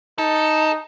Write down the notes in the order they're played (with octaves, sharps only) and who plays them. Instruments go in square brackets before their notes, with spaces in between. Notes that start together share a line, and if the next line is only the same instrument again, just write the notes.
[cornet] D#4 [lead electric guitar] A4